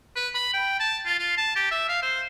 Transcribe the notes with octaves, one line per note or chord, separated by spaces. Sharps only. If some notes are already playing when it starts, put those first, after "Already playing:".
B4
B5
G5
A5
F4
F4
A5
G4
E5
F5
C5